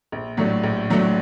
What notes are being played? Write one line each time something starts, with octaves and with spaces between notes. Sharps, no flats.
A#1
A2 F#3 A3 D4
A#1
A2 F#3 A3 D4